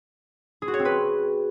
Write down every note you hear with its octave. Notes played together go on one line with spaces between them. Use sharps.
G#4
F#4
C#5
C4
B4